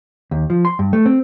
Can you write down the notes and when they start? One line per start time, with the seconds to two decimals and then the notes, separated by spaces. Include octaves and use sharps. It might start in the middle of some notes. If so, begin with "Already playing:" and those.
0.31 D#2
0.50 F3
0.65 C6
0.79 G2
0.93 A3
1.06 C4